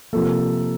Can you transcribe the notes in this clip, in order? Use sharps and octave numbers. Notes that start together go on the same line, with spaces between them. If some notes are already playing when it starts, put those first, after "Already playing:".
C3 F3 A#3 A4